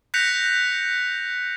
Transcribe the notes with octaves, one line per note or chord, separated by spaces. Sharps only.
F#6 G6 A#6 B6 C#7 F7